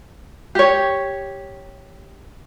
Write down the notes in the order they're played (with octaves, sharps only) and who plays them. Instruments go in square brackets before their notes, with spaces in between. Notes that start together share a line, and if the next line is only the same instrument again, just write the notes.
[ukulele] G4 C#5